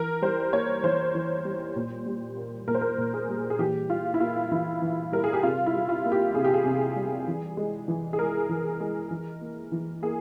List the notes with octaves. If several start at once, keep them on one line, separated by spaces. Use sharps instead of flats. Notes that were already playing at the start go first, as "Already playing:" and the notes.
Already playing: E3 A#4
G3 C5
A#3 C#5
E3 C5
E3
G3
A#2
G3
A#3
A#2 A#4
C5
A#4
A#2
G#4
G3
G#4
E3 G4
G3 F4
E4
A#3 F4
E3 E4
E3
G3 A#4
G#4
G4
C3 F4
E4
G3
F4
A#3
G4
C3 G#4
G4
G#4
C3
G3
E3
G#3
E3
G#4
G#3 A#4
E3
G#3
E3
A#3
E3
A#3 G#4